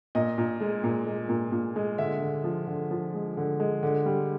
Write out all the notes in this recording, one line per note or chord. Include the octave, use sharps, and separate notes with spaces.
A#2 D#5
A#2
G#3
A#2
G#3
A#2
A#2
G#3
D3 E5
D3
F3
D3
F3
G#3
D3
G#3
D3
G3